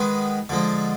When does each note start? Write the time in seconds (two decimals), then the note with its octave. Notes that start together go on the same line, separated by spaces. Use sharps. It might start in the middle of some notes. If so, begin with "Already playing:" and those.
Already playing: D#3 G#3 B3
0.49 D3 F3 G#3